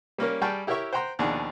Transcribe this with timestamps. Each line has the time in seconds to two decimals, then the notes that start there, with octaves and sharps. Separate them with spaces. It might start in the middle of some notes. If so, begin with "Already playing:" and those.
0.18 G3 A#3 C#4 A#4
0.41 G3 G#4 G5 A5 C#6 F6
0.67 E4 G4 A#4 C#5 E5 C#6
0.93 C5 F#5 G5 A#5 C6
1.19 D#2 B2 F3 D4 G#4 F#5